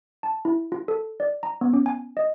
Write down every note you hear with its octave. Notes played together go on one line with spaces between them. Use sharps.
A5
E4
F4
A4
D5
A#5
B3
C#4
G#5
D#5